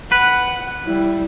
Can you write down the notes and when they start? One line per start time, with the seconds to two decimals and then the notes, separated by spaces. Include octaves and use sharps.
0.12 B4 F#5
0.85 G3 E4